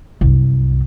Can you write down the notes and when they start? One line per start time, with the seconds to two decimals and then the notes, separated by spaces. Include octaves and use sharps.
0.21 C2 F#2